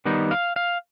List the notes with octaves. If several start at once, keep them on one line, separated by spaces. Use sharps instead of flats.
D#3 G3 B3 D#4
F5
F5